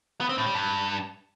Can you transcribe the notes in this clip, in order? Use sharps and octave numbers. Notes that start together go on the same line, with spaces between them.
B3
C4
A2
G3
G2